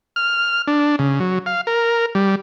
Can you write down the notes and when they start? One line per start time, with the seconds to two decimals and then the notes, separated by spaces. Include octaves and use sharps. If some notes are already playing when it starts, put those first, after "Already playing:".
0.16 F6
0.67 D4
0.99 C#3
1.20 F#3
1.46 F5
1.67 A#4
2.15 G3